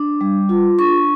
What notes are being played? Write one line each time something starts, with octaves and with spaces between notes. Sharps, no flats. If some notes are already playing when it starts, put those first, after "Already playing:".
Already playing: D4 D6
G3
F4
D4 C#6